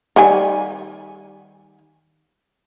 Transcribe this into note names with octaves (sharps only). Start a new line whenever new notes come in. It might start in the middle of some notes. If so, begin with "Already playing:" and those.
D#3 G3 G#5